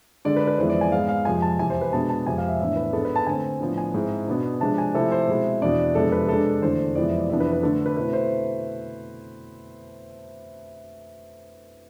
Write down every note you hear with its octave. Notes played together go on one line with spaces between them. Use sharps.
D3 G#3 D4 D5
B4
B4
F2 E3 G#3 B3 C5
D5
G#5
G#2 G#3 B3 F5
F5
F2 C3 F3 G#3 G#5
A5
E2 C3 E3 G#5
C5
B4
B2 G#3 B3 D4 A5
A5
F2 C3 G#3 G#5
F5
E5
A2 E3 B3 D4 E5
B4
G#2 G#3 B3 D4 A4
B4
A5
D3 A3 C4 G#5
A2 F3 B3 D4
G#5
G#2 G#3 C4 E4
B2 B3 D4
C3 F3 G#3 D4 A5
G#5
C3 F3 A3 C4 E4 A4
C5
B2 G#3 C4 E4
E2 B2 B3 D4 D5
F2 C3 G#3 B3 D4 A4
B4
C3 G#3 D4 A4
E2 D3 A3 D4 C5
F2 C3 E3 G#3 B3 D5
D5
F2 C3 E3 B3 D4 E5
B4
B4
D3 A3 D4 A4
B4
B2 A3 C4 E4 B4
C5